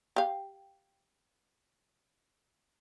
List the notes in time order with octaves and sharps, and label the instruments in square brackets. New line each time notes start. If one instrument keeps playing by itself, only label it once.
[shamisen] G4 F5